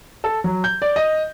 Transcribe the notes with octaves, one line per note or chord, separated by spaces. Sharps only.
A4
F#3
G6
D5
D#5